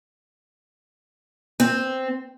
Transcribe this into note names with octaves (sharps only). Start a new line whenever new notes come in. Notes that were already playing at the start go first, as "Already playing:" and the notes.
C4